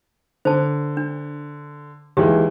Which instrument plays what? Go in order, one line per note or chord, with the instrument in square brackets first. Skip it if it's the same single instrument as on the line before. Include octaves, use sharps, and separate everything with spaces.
[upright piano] D3 [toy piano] C5 A5
[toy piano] D4
[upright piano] D#2 E3 G#3 [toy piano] G4